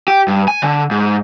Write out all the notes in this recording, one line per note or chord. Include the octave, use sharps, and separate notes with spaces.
G4
G2
G#5
D3
G#2